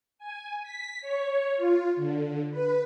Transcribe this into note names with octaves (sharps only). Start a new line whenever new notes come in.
G#5
B6
C#5
F4
D3
B4